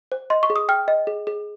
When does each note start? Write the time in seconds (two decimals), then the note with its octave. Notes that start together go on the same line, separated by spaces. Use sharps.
0.12 C5
0.30 D#5 C6
0.43 C#6
0.50 G#4
0.56 D#6
0.69 G5 F6
0.88 D#5
1.07 G#4
1.27 G#4